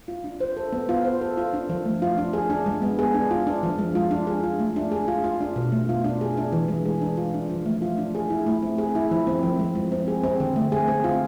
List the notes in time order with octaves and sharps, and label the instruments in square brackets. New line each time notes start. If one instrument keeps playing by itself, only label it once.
[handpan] F4
D4
C5
A4
B3
F4
C5
A4
F4
D4
F3
A3
F4
D4
G#4
D4
G#3
B3
G#4
D4
F4
D4
F3
G#3
F4
D4
G#4
F4
A3
D4
G#4
F4
F4
D4
B2
A3
F4
D4
G#4
D4
E3
G#3
G#4
D4
F4
D4
F3
A3
F4
D4
G#4
E4
A3
C4
G#4
E4
F3
C4
F3
G#3
F3
C4
G#4
C4
D3
A3
G#4
C4
F4